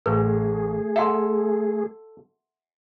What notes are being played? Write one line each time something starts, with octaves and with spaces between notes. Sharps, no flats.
A1 A3 G#4 B4
A4 E5 F#5 C6